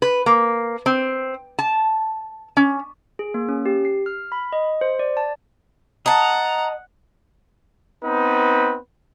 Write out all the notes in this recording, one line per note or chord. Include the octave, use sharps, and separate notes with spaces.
B4
A#3
C4
A5
C#4
G#4
A#3
C#4
G4
C7
F6
B5
D#5
C5
D5
A5
D#5 F#5 A5 A#5
B3 C4 D#4 B4